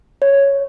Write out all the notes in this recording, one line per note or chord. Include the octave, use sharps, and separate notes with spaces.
C#5